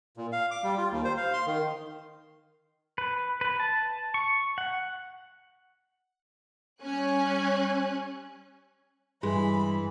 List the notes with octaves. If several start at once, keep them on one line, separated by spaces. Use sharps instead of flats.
A#2
F5
D6
G3
F4
D#2
C5
F5
C6
D#3
B4
B4
A5
C#6
F#5
G3 C#4 G#5 F#6
G2 E3 G#3 B5